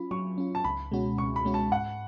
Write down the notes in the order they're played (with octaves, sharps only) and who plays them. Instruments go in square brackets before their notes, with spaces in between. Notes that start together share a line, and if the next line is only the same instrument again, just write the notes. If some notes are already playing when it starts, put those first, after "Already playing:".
Already playing: [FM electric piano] F#3 C#4 F4 [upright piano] B5
[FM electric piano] F#3 [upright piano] C#6
[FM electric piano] C#4 F4
[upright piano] A5
[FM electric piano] C#2 [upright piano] B5
[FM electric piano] B2 G#3 C#4 F#4
[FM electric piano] C#2 [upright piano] C#6
[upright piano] B5
[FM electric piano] B2 G#3 C#4 F#4
[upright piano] A5
[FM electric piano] G#2 [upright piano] F#5